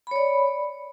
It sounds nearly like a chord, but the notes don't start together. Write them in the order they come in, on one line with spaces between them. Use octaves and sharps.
B5 C#5 D5